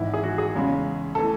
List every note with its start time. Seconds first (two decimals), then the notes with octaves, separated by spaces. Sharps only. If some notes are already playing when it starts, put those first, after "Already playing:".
Already playing: G#1 G#2 E3 E4
0.14 G#4
0.23 F#4
0.38 G#4
0.54 E2 C#3 G#3
1.15 E3 A3 A4